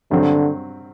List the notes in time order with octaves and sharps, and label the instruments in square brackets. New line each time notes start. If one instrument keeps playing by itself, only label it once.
[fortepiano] G2 F#3 C4 [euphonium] D3